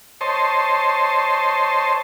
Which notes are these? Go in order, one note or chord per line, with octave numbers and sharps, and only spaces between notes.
C5 C#5 D#5 A5 C6